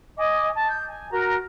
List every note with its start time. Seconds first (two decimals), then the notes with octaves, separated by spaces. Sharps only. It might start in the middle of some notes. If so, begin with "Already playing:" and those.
0.17 D#5 G#5 D6
0.54 A5
0.68 G6
0.88 G#5
1.11 F#4 A#4 A#5